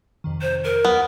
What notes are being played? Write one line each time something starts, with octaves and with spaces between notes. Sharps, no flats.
F2 C3 D#3
C5
A#4
D#2 F#3 B3